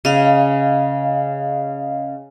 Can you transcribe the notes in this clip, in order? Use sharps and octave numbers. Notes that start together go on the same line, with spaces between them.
C#3 D#5 F5